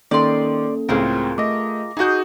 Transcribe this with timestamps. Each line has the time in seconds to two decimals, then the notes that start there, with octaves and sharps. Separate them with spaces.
0.11 D#3 A#3 C#4 A4 D5 C6
0.89 C#2 A2 C4 F4 G#4 A#4
1.38 A3 D#5 D6 A#6
1.97 D#4 F#4 G#4 D#5 G6